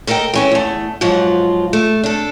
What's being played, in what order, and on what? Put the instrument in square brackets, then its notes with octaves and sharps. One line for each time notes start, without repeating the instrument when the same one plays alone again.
[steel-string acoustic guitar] A4 A#4 D#5 E5 G5
E3 C#4 E4
E2 A3
G#2 F3 F#3 F4
A3
D4 A4